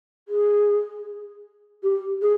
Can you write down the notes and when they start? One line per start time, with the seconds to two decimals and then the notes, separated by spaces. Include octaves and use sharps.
0.28 G#4
1.83 G4
2.22 G#4